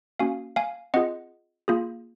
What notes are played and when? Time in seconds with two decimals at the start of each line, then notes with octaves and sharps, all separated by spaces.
0.19 A#3 C#4 F#4 F5 G#5
0.56 F5 G#5
0.94 C4 F4 G#4 D#5 F#5
1.68 A#3 F4 G#4